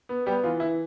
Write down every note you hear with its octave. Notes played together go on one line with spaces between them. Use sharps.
B3
G3 B3 G4
E3 F4
E3 E4